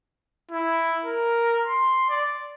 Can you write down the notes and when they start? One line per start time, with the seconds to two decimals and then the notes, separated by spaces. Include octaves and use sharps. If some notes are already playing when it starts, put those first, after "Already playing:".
0.51 E4
1.04 A#4
1.66 C6
2.09 D5